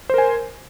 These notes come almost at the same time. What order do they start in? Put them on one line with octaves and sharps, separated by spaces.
C5 A#4 G#5